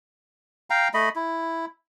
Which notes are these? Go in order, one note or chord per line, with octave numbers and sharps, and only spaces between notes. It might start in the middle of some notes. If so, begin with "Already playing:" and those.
F5 G5 A#5
A3 D#5 B5
E4